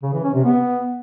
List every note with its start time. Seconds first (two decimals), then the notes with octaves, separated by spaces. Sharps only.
0.03 C#3
0.13 E3
0.24 C#4
0.34 C3
0.45 B3